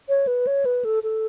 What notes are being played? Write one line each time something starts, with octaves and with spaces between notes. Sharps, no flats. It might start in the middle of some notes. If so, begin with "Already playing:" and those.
C#5
B4
C#5
B4
A4
A4